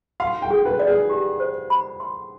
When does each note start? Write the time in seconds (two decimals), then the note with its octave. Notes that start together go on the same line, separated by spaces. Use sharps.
0.20 F5 C6
0.42 G5
0.51 G#4
0.65 B4
0.80 D5
0.87 G#4
1.10 G4
1.40 C5
1.70 B5
2.00 C6